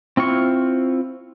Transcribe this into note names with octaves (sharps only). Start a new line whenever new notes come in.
C4 E4 F4 C#6